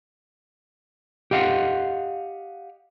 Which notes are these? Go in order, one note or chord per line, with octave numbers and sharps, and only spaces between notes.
G4 D#5 F5 F#5